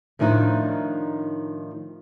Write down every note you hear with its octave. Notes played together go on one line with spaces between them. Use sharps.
A2 D#3 F3 D4 D#4 F4